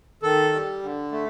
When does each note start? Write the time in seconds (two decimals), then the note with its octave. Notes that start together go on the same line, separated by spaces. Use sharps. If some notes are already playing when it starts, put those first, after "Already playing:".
0.23 D#3 A4
0.52 G3
0.82 D3
1.12 A3